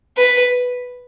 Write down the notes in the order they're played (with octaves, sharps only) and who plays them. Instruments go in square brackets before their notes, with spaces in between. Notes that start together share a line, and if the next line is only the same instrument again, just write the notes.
[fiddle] B4